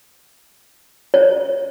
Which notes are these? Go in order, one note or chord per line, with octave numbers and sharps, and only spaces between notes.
C#5